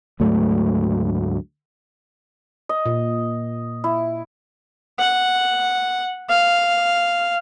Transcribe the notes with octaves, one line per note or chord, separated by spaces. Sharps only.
D2 G#2 F#3 A3
D#5
A#2
E4
F#5
F5